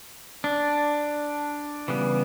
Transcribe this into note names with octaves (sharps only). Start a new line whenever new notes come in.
D4
C#3 E3 G3 B3